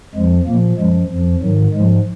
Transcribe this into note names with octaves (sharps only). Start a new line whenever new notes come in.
F2 F3 G#3
A#2 F3 A#3
F#2 F3 G#3
F2 F3
G#2 D#3 F#3
G#2 F3 G#3